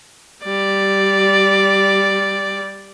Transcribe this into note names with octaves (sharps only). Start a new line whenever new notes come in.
G3 D5